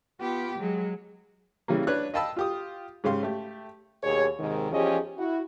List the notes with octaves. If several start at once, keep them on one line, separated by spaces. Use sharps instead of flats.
B3 F4 G4
F#3 G#3
C#3 E3 G3 A#3
D4 B4 C#5 F#6
D#5 F5 G5 A5 B5 E6
F4 G4 D#6
G#2 C#3 G4 F5 C6
A3 G4
D#2 B2 G#4 C#5
D#2 G#2 C3 D#3
E2 F3 C#4 G4 G#4 D#5
E4 F#4